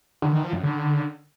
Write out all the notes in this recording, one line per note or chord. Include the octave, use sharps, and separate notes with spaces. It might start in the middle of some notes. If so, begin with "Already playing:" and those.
D3
D#3
F3
F#2
D3